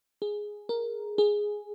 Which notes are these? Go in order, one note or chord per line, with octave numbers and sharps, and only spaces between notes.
G#4
A#4
G#4